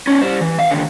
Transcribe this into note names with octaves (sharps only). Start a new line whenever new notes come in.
C#4 D#4
G3 C5
E3
E5 F5
D#2 D3